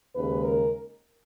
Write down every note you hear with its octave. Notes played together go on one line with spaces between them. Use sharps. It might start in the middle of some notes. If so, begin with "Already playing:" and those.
D#2 C#3 G#3 B4
A#4